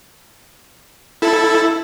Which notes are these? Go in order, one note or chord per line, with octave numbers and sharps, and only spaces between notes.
E4 A4